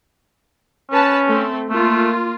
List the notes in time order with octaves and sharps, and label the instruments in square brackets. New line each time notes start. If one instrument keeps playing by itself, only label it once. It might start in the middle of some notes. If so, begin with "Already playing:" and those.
[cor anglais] C#4 [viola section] B4 A5
[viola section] A3 C4
[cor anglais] A3 [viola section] A#3 F4